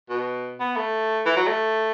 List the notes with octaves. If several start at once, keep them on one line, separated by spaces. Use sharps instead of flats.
B2
B3
A3
E3
F#3
A3